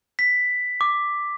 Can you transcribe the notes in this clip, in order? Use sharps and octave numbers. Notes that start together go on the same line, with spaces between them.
B6
D6